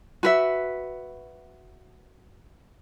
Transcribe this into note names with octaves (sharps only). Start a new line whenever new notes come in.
F#4 B4 E5